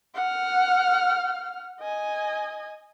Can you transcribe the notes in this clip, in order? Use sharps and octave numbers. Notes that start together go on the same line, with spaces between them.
F#5 F6
D#5 G#5